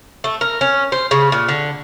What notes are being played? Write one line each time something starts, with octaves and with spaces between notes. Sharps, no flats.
A3
A#4
C#4
C5
C#3
A#2
D3